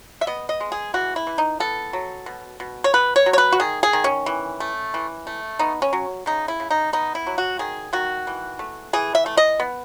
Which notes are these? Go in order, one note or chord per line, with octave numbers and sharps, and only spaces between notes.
E5
B3 D#5
D#5
G#3
G#4
E3 F#4
E4
E3
D#4
B3 A4
F#3
B2
B2
C#5
B3 B4
C#5
F#3
C#5
B4
F#4
D#3 G#4
G#4
D#3
C#4
E3
A3
E3
A3
B3 D#4
C#4
F#3
C#3 D#4
E4
C#3
D#4
B3 D#4
E4
F#3
F#4
D#3 G#4
D#3 F#4
E3
A3
E3 G#4
E5
A3
D#5
B3